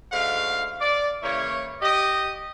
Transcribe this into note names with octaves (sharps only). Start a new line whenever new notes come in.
G#2 D3 A3 F#4 F5
D5
C#3 E3 A#3 E4 C#5
G4 D#5